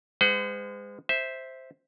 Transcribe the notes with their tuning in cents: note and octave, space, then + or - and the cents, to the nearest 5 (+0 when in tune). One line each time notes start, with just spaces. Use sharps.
G#3 -25 C5 -45 F#5 +0
C5 +0 E5 -10